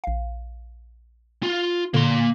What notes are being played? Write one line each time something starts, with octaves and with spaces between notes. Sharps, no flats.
A#1 F5
F4
A#2 D3 A#3 C6